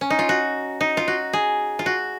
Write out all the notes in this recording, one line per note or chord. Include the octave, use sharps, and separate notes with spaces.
C#4
D#4
F4
F#4
D#4
F4
F#4
G#4
F4
F#4